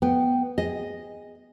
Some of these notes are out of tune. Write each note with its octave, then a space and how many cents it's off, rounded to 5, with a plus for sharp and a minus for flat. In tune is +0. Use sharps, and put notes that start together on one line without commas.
B3 +0 G5 +0
G#4 -15 D#5 +0